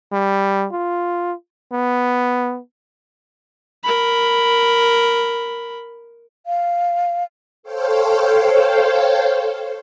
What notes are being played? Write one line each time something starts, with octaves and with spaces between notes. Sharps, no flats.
G3
F4
B3
A#4 B5
F5
A4 C5 C#5 F5 G5